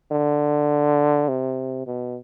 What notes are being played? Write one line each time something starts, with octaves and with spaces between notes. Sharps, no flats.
D3
C3
B2